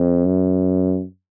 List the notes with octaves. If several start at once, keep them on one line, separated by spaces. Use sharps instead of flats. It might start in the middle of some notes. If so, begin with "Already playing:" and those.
Already playing: F2
F#2